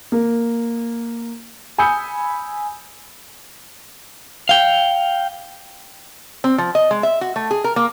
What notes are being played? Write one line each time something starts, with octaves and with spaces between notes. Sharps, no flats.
A#3
G#5 B5 D#6 E6 G6 C#7
F5 G5
C4
F3
D#5
G#3
E5
F#4
A3
G#4
A#4
A#3